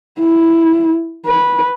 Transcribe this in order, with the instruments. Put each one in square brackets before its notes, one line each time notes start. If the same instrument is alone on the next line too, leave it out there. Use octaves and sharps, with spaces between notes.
[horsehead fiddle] E4
B4